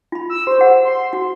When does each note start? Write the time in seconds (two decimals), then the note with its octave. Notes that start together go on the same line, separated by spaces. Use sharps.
0.12 F4 B5
0.30 E6
0.47 G4 C5
0.58 G#4 F#5
0.85 C6
1.13 F#4